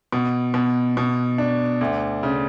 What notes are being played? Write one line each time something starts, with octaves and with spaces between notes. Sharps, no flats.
B2
B2
B2
D4
D2
C#3